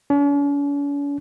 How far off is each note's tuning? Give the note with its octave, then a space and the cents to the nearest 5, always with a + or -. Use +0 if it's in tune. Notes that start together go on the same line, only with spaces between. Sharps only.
C#4 +45